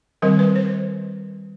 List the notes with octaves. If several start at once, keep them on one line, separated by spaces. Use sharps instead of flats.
D#3 G3 C4 A#4
B4
C5